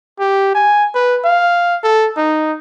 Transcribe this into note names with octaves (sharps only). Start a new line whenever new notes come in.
G4
G#5
B4
F5
A4
D#4